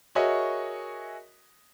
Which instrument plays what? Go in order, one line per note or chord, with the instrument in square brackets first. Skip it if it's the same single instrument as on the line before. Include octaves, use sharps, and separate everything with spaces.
[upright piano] F#4 G#4 A#4 C#5 D#5 E5